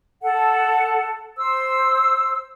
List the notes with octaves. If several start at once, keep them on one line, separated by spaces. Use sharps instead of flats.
A4 F#5
C5 E6